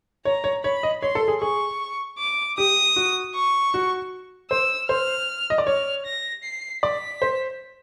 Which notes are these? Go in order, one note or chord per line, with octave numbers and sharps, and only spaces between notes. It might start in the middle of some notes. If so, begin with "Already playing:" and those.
C#5 A#5
C#5
C#5 B5
D#5
C#5 C6
A4
G#4
G#4 C#6
D6
G4 D#6
F#4
C#6
F#4
C5 E6
C5 F6
D#5
D5
C#5 F6
A#6
C7
D5 B6
C5